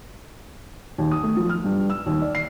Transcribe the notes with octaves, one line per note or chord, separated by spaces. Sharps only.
D#2
D#6
A3
F3
F6
G2
E6
D#2
D5
C7